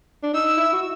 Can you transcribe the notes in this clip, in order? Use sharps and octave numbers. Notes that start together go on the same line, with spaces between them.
D4
D#4 E6
E4
F#4